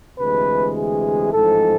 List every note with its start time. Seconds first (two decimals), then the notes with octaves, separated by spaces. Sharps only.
0.19 D2 C3 E3 G#3 B4
0.76 G#4
1.33 A1 G#2 F3 G#3 A4